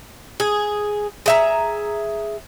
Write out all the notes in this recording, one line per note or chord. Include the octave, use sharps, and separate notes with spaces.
G#4
G#4 E5 A#5